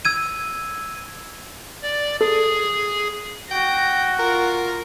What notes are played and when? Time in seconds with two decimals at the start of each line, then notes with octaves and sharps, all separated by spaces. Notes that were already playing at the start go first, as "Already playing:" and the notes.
0.05 E6 G#6 D#7
1.82 D5
2.21 G#4 A4
3.51 F#4 G5 A#6
4.19 F4 A#4